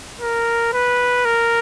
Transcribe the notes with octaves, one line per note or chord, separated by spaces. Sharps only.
A#4
B4
A#4